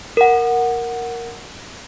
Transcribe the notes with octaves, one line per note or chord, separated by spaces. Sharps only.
A#4 F#5